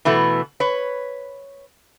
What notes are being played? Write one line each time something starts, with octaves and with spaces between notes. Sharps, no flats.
B2 E3 A3 B3
B4 C#5